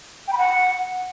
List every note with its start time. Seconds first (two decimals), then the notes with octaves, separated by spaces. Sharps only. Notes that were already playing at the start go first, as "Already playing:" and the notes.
0.28 G5
0.33 B5
0.38 F#5